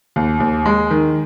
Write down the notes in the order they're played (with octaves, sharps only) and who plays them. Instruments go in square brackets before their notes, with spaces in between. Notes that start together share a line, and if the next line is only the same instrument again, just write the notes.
[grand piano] D#2
D#2
G#3
D#3